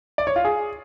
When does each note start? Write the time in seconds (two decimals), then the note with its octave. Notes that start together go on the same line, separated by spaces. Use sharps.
0.18 D5
0.27 C#5
0.36 F4
0.45 G#4